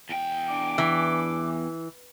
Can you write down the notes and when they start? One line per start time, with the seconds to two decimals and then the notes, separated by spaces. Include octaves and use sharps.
0.09 E2 G5
0.48 D4 D6
0.78 E3